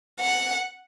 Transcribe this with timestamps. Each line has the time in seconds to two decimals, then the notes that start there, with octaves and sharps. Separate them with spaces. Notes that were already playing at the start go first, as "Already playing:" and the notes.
0.20 F#5